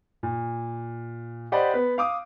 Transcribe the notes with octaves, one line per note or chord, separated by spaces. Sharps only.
A#2
G4 C5 D5 D#5 F#5 B5
B3 B4
F5 D6 D#6